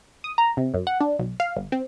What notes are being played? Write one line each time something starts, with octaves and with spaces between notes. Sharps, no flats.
D#6
A#5
C3
F#2
F#5
D4
B1
F5
G1
C4